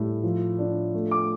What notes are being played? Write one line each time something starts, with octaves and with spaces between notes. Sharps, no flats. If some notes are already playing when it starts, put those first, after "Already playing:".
Already playing: A2 G3
F3
D4
A3
D6